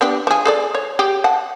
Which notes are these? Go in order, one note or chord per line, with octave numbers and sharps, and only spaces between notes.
B3 D4 G4
F3 G#4
G#4 A4 D5
C#5
G4 G#4 G5
F#5 A5